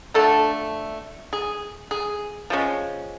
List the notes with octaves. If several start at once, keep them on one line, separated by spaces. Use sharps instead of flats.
D3 F3 A3 D4 A4
G#4
G#4
F3 G#3 C#4